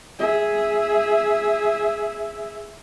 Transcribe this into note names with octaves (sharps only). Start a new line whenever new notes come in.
G#4 E5